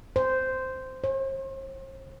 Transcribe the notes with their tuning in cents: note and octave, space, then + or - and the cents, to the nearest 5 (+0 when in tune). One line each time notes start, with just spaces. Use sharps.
C5 -10
C5 +45